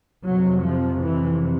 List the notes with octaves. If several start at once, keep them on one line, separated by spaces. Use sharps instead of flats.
F2 C3 F#3
F3
E3